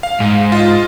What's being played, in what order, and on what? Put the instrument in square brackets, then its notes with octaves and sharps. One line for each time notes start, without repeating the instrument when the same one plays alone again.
[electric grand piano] F5
[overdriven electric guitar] G#2
[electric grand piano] F4 D#5